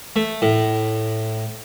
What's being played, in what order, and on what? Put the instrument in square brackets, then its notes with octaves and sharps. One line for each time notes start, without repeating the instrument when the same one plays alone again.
[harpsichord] A3
A2